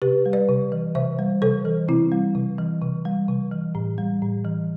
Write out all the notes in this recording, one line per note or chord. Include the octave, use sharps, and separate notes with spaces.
C3 G4 B4
G3
B4 D5
C3
E3
C3 C5 E5
G3
C3 A4 C5
E3
C3 C4 E4
G3
C3
E3
C3
G3
C3
E3
A2
G3
A2
E3